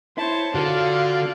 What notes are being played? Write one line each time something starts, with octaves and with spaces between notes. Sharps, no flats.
E4 C5 C#5 A5
D3 F4 F#4 A4 D5 F5